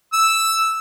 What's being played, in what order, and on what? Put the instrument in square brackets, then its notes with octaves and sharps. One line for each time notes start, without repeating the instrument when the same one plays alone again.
[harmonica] E6